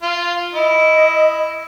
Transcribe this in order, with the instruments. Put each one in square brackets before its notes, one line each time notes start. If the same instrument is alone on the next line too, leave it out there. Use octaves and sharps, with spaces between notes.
[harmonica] F4
[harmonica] E4 [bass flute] D#5